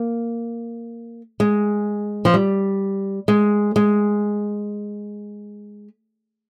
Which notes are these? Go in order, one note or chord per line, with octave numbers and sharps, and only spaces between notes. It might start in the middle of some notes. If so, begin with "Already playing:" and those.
Already playing: A#3
G#3
F3
G3
G#3
G#3